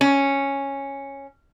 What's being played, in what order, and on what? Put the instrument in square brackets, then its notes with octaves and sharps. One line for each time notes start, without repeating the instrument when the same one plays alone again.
[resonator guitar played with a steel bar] C#4